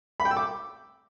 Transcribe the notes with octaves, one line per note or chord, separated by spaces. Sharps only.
B5
G5
E6
D6